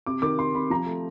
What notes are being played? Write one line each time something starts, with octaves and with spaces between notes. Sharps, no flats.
C3 D6
D#3 D6
C3 C6
C3 B5
F3 A#5
A3